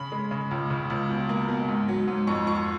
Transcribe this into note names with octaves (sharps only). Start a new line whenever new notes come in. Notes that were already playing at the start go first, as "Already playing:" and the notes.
Already playing: C#3 B5
G#3
C#3
C#2
C#3
C#2
B2
A#3
B2
G#2
F#3
G#2
F2 C#6
F3 C#6